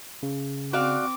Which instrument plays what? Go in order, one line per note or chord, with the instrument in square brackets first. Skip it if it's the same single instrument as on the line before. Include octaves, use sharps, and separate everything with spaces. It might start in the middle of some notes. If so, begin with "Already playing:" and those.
[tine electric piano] C#3
[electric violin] C4 D6 [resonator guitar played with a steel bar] F#4 D5 F5